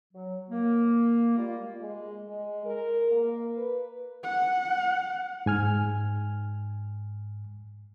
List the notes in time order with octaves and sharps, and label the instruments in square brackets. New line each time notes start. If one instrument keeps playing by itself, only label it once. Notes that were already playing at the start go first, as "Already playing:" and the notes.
[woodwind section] F#3
A#3
G3 G#3 A#3 F4
[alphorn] G#3
G#3
A#4
A#3
B4
[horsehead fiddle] F#5
[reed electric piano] G#2 G#5 F6